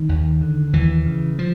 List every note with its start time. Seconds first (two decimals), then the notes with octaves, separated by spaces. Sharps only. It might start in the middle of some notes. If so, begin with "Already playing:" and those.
Already playing: D#3
0.09 D#2
0.41 D3
0.73 D#2 E3
1.06 C#3
1.39 F3